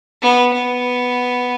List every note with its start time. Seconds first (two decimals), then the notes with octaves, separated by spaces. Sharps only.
0.22 B3
0.53 B3